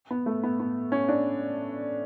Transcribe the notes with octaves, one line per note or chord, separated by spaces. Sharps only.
B3
A3
B3
B3
C#4
D4